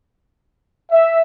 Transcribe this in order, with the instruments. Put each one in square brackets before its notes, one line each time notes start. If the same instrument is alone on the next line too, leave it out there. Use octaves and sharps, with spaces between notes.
[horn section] E5